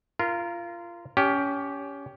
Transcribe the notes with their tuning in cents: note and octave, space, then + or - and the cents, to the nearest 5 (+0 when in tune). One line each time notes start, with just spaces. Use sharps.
F4 -20 A#4 +0
C#4 +25 G4 +0